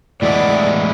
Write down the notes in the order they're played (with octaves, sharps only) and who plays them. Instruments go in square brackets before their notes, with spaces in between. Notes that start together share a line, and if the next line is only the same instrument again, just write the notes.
[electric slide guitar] A2 E3 G#3 B3 E4 [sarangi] D5